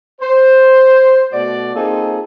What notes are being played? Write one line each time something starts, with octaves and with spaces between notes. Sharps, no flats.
C5
B2 A3 F#4 D5
A#3 C4 D#4 F4 G#4 A4